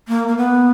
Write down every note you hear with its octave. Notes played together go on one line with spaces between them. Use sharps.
A#3
A#3
B3